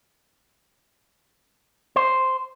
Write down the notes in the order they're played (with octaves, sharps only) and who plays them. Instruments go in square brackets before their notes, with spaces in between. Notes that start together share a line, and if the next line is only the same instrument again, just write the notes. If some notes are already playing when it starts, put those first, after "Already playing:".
[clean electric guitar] C5